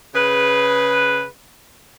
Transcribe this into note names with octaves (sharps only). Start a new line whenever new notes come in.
C#3 G#4 B4